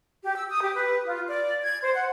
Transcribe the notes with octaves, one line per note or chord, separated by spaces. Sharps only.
G4
E6
D#6
G4
B4
F4
D5
G#6
C5
F#5